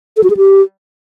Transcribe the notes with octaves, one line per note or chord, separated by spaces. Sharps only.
A4
F#4
G#4
G4